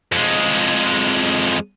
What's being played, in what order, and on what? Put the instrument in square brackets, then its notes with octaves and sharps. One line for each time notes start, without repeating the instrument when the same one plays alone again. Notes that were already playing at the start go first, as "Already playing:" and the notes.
[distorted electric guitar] F2 G#3